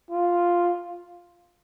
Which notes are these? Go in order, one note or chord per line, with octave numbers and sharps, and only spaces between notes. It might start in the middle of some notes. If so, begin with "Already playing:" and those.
F4